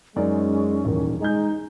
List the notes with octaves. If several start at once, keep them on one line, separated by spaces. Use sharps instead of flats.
F#2 G#3 C#4 D#4 D5
D#1 E2 D#3
G#3 D#4 G#4 G#5 G6